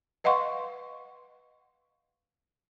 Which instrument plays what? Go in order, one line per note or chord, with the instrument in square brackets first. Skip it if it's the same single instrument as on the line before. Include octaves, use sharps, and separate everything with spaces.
[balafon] B4 D#5 F5 F#5 C6 C#6